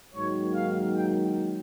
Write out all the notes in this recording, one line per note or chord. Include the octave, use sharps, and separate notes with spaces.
G#2 D#3 F#3 A#3 C#5
F5
G5